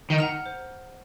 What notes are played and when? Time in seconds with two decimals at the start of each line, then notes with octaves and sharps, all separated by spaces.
0.10 D#3
0.18 F#5 A#5 F6
0.46 C5